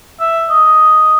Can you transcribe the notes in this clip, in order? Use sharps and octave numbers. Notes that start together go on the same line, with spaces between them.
E5
D#5